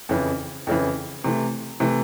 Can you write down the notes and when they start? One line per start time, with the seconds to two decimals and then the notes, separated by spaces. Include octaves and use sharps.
0.09 F2 C#3 E3
0.67 F2 C#3 E3
1.24 C3 E3 A3
1.80 C3 E3 A3